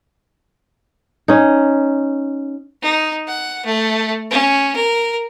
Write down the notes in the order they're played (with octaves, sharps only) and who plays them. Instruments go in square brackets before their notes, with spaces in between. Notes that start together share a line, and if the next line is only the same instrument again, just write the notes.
[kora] C#4 D#4
[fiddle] D#4
F#5
A3
C#4
A#4